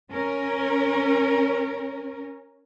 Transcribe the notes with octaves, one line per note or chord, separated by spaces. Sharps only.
C#4 A#4